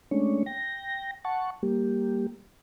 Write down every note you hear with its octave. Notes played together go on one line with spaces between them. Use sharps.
G#3 A3 C#4 D4 C#5
G5 A#6
F#5 A5 C#6
G3 A#3 G4